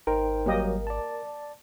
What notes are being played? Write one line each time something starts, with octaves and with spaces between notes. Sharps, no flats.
G#1 D#4 A#4 C5 G5
F#3 G3 A#3 G4 D#5
D5 A5